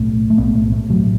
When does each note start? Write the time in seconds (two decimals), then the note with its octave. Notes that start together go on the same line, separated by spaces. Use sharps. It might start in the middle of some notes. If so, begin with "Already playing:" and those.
Already playing: B1 A2 A3
0.30 A3
0.37 B1 A2 B3
0.55 A3
0.72 A3
0.89 B1 A2 F#3